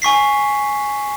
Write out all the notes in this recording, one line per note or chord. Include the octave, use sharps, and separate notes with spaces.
G#5 C#6 B6 C7